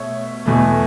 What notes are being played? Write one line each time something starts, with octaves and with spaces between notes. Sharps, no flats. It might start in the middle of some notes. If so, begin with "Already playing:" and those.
Already playing: B2 A3 C#5 E5
E2 B2 A3